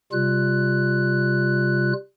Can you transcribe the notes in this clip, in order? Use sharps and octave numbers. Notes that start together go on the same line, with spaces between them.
C3 G3 F4 F#6